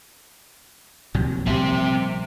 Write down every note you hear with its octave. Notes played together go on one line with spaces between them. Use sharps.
A#1 C3 F#3
A#1 G3 C4 E5